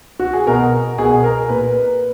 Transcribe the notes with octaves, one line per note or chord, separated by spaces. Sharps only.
F#4
G#4
B2 A#4
B2 G#4
A#4
A#2 B4